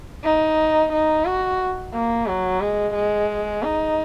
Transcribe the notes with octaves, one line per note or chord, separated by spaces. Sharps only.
D#4
D#4
F#4
A#3
F#3
G#3
G#3
D#4